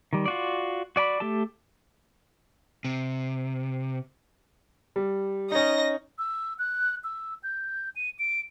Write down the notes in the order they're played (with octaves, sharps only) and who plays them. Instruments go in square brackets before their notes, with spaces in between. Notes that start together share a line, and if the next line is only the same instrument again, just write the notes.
[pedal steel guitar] D#3 G3
F4 F#4 D5
F#4 D5 G#5 B5
A3 G4 A4 A5
[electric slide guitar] C3
[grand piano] G3
[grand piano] C#4 D#4 [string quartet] D#5 A#6
[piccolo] E6
F#6
E6
G6
D#7
D7